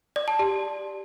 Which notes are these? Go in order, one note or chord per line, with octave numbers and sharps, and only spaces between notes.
D5
A5
G4